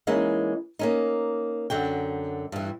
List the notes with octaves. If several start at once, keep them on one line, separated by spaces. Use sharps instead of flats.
E3 G#3 A#3 C#4 D#4
A#3 C#4 D#4
F#2 D3 F#4 G5
G2 E3